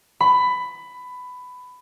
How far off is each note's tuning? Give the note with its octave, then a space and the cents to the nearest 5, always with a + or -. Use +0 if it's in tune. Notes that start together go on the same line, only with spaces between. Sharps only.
B5 +15